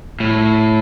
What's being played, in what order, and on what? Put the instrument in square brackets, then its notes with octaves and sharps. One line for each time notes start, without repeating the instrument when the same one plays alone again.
[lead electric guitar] A2